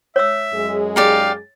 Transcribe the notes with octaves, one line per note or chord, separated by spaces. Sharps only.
C#5 E5 E6
F#2 G#3 G#4
D#4 G4 D5 F5